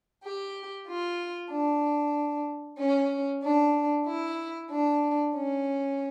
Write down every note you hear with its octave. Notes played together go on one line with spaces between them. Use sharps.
G4
F4
D4
C#4
D4
E4
D4
C#4